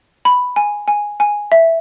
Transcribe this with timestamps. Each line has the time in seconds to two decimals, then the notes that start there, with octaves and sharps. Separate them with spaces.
0.25 B5
0.56 G#5
0.88 G#5
1.20 G#5
1.52 E5